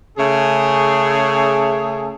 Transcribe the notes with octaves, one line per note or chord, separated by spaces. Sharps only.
C#3 A3 G#4